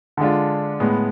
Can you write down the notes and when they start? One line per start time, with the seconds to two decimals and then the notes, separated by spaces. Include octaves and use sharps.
0.17 D3 G#3 D4 F4
0.80 A2 G#3 B3